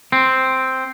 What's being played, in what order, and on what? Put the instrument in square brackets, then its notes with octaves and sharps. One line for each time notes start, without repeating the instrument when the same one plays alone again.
[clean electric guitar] C4